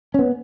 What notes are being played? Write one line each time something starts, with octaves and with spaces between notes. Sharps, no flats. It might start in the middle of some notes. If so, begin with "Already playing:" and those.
C#4
B3